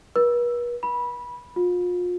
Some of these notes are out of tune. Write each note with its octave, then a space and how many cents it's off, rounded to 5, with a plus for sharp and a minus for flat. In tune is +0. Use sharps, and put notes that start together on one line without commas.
B4 -45
B5 -15
F4 +35